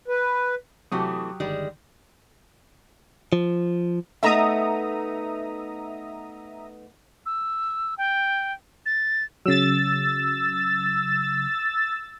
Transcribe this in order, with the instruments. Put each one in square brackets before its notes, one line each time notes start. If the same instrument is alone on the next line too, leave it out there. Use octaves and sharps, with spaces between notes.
[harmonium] B4
[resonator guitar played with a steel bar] C3 E3 A3 [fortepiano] F#3 G4 [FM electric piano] C#6 D#6
[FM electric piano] G1 D3 D#3 [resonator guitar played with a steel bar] G3 G#3
[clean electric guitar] F3
[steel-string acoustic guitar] A3 B3 D#4 [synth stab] E5 A#5 D#6
[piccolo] E6
G5
A6
[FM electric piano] C#3 F#3 [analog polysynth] E6 A6